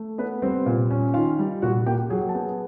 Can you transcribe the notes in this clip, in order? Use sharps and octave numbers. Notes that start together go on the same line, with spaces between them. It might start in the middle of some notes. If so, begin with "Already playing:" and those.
Already playing: A3
B3 B4
G3 C4 C5
A#2
C#4
D#3 F4 F5
G3
A#2 F#4 F#5
A#3 G4 G5
F#3 G#4 G#5
A5
B3 G#4 G#5